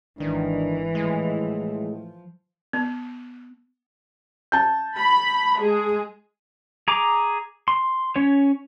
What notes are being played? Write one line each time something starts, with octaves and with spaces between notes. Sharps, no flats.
G#1 D#3 E3 D4
A2 F3 G#3
B3
A5 G6
B5
G#3 G#4
G#4 A#5 D6
C6
C#4 C#5